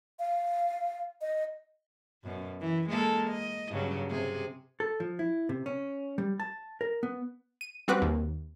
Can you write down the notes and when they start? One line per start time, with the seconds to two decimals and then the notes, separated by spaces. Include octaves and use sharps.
0.19 F5
1.21 D#5
2.23 F#2 B2
2.60 E3
2.89 G#3 A#3 A4
3.31 D#5
3.70 G2 C#3 F#3
4.09 C3 G#4
4.80 A4
5.00 F3
5.19 E4
5.49 C3
5.66 C#4
6.18 G3
6.40 A5
6.81 A#4
7.03 B3
7.61 D#7
7.88 G3 C4 F#4 B4 D6 F#6
8.02 D#2